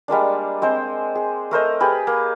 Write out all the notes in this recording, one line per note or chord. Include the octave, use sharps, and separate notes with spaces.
G3 G#3 A#3 D4
G#3 C4 C5
G#4
A3 A#4 C5 D#5
G4 G#4 B4
A#3